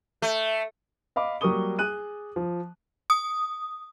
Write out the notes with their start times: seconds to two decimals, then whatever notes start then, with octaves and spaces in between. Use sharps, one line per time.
0.22 A3
1.16 D#5 F5 B5 D6
1.41 F#3 G3 A#3 C#6 D#6 G7
1.79 G#4 F#6 D#7
2.36 F3
3.10 D#6